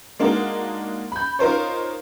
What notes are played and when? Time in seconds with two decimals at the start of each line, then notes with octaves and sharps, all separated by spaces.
0.19 G#3 A#3 D4 D#4 F#4 A#4
1.12 B5 G6
1.39 D#4 F4 A#4 C5 C#5